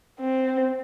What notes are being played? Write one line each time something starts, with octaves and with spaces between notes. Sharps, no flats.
C4